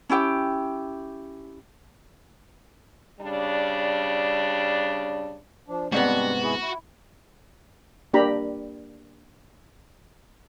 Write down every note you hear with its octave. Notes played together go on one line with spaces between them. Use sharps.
C#4 E4 G4 G5
C#3 G3 D4
F3 D4
G#2 C3 G3 B3 D4 F#4
E4 G#4
E4
A#3 D4 G4 A#5 B5